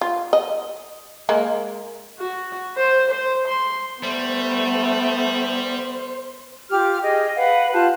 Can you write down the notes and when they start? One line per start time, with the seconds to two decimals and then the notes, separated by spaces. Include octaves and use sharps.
0.01 F4
0.33 D#5
1.29 G#3 A#3
2.20 F#4
2.76 C5
3.10 C5
3.47 C6
4.03 G3 A3 B3 C5
6.70 F4 G4 D6 F6
7.01 G#4 D#5 G5
7.36 B4 F5 F#5
7.73 F4 G4 A5 F#6